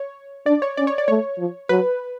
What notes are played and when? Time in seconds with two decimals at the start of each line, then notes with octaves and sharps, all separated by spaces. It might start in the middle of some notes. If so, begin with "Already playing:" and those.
Already playing: C#5
0.46 D4 D5
0.62 C#5
0.77 C#4 D5
0.87 C#5
0.98 D5
1.08 A3 C#5
1.38 F3
1.69 F#3 B4